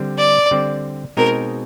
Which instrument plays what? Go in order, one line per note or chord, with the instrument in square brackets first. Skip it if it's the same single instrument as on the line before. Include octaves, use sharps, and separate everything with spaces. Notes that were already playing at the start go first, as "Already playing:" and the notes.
Already playing: [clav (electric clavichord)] D3 G3 C4
[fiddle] D5
[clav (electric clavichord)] D3 G3 C4
[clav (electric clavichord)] B2 G#3 C4 D#4 [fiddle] A#4